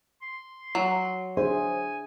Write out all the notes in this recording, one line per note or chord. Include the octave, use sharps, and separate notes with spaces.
C6
F#3
D4 G#4 C5 E5 G#5